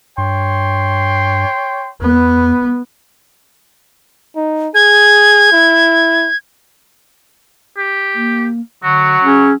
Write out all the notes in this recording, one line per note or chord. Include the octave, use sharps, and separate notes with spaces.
G2 C#5 G5 C6
E2 B3
D#4
G#4 G#6
E4
G4
A#3
D3 F#3 F#4
C#4 G#4